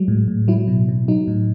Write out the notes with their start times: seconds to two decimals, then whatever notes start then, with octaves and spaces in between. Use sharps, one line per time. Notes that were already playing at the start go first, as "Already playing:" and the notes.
Already playing: F#3 G#3
0.08 A2
0.28 A2
0.48 F#3 E4
0.68 B2
0.89 B2
1.08 F#3 D#4
1.28 A2